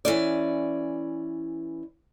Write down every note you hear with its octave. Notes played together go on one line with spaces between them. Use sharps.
E3 C#4 D5